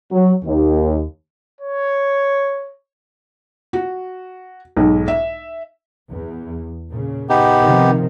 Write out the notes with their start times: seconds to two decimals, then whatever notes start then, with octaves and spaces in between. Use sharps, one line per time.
0.12 F#3
0.45 D#2
1.61 C#5
3.73 F#4
4.77 B1 G#2
5.08 E5
6.10 E2
6.91 A#2 C#3
7.29 B3 D#4 G4
7.62 C3 D#3 F3